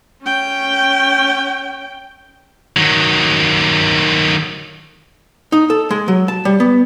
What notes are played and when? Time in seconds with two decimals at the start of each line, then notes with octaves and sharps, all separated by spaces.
0.22 C#4 G5
2.76 D#3 F#3
5.52 D#4
5.70 A4
5.90 G#3
6.08 F#3
6.28 A5
6.45 G3
6.60 B3